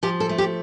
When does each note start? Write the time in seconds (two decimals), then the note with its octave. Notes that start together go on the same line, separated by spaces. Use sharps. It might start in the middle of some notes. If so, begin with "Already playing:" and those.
0.03 F3 G4
0.20 A4
0.29 A3
0.38 G4